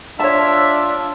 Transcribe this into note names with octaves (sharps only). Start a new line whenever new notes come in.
D4 F4 C#5 E5 A5